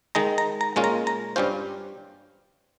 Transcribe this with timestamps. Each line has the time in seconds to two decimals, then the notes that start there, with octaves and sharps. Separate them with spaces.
0.15 D#3 G#3 D#4 A#5
0.38 A#5
0.61 A#5
0.76 A#2 G#3 C#4 F4
0.84 A#5
1.07 A#5
1.36 G2 G3 C#4 F4 C5